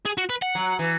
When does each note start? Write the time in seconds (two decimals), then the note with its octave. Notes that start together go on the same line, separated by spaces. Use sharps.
0.05 G#4
0.18 F#4
0.30 B4
0.42 F#5
0.55 F#3
0.79 E3